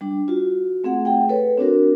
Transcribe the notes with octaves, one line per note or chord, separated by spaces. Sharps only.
G3 D4
F4 F#4
A3 C4 G#4 F#5
A3 G#4 F#5 G5
A4 B4 C#5
C4 D4 F#4 A#4